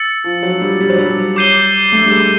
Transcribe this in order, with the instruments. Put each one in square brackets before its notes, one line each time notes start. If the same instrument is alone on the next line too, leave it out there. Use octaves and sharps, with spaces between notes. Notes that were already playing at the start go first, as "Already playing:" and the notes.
Already playing: [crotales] E6 A6 C#7
[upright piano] F3
F#3
G3
G3
F#3
G3
[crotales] D6 G6 C7 D#7 G7
[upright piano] A3
G3
G#3